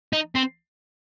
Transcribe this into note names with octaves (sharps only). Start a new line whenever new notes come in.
D#4
C4